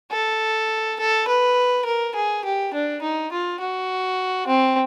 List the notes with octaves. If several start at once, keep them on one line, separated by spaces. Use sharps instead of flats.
A4
A4
B4
A#4
G#4
G4
D4
D#4
F4
F#4
C4